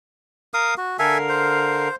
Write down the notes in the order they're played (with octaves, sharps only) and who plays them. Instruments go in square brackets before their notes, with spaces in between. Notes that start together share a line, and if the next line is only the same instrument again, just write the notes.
[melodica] A#4 F5 D#6
F#4
[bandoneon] D3 A#4 F5 [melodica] A4 E5 G#5
[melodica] C5